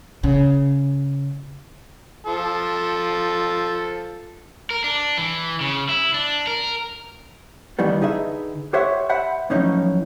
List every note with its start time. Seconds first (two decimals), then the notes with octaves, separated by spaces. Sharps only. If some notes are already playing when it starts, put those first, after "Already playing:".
0.23 C#3
2.26 F3 A4
4.71 A#4
4.84 D4
5.18 E3
5.61 C#3
5.89 E4
6.14 D4
6.47 A#4
7.79 E2 A2 D#3 E3 G3 B3
8.01 D3 D#4 G#4 B4 E5
8.73 G4 A#4 C5 C#5 E5 F#5
9.09 C5 E5 F#5 B5
9.50 F#2 A2 E3 F3 C#4 D#4